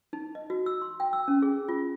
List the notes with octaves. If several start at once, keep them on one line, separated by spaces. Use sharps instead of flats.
D#4
D#5
F#4
E6
C6
G5
E6
C#4
G#4
F4